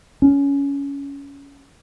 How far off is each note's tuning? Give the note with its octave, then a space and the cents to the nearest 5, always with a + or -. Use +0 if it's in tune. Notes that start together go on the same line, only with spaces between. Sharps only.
C#4 +15